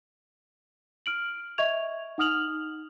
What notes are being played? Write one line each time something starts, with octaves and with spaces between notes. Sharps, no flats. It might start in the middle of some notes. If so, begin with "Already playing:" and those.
F6 D7 F#7
D#5 E5 C#6 G#6 F7
D#4 F#5 D#6 F6 F7 F#7